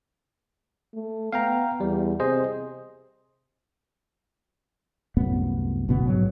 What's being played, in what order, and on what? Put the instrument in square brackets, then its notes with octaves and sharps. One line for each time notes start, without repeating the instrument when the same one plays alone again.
[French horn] A3
[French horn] B3 [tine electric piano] F5 G5 A#5
[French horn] E2 [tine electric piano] G3
[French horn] C3 [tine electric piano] G#4 C5 D#5
[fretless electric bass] C2 F#2 A2 B3
F#1 B2 D3 B3
A#1 G#2 F#3